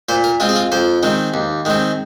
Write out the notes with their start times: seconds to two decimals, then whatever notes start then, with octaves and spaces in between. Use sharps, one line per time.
0.09 A#2 C5
0.24 A#4
0.40 G#3 C4 F4
0.49 G#4
0.56 F4
0.72 F2 C5
1.03 D#3 G#3 C4
1.34 D#2
1.65 D#3 G#3 C4